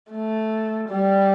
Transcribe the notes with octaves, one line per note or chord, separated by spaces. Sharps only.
A3
G3